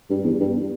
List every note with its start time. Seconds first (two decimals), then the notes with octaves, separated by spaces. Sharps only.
0.10 G2
0.24 E2
0.40 G2